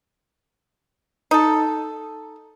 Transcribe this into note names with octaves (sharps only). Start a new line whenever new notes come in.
D#4 A4